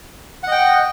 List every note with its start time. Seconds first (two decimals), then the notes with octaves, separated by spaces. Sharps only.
0.44 F#5
0.48 D#5
0.52 G5